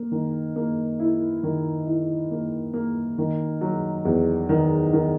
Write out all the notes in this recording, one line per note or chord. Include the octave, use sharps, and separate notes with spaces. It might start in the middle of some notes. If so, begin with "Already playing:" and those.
Already playing: A#3
D#3
A#3
E4
D#3
E4
A#3
A#3
D#3
F#3
E2
D#3
D#3